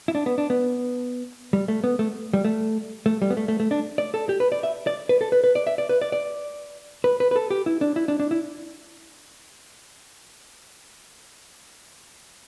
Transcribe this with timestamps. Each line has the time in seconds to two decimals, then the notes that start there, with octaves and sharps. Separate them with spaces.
0.08 E4
0.15 D4
0.26 B3
0.38 D4
0.50 B3
1.53 G3
1.68 A3
1.84 B3
1.99 A3
2.33 G3
2.45 A3
3.06 A3
3.22 G3
3.30 B3
3.37 A3
3.48 A3
3.60 A3
3.71 D4
3.98 D5
4.14 A4
4.29 G4
4.40 B4
4.52 D5
4.63 E5
4.87 D5
5.09 B4
5.21 A4
5.32 B4
5.44 B4
5.55 D5
5.67 E5
5.78 D5
5.89 B4
6.01 D5
6.12 D5
7.04 B4
7.20 B4
7.31 B4
7.36 A4
7.50 G4
7.66 E4
7.81 D4
7.96 E4
8.08 D4
8.20 D4
8.31 E4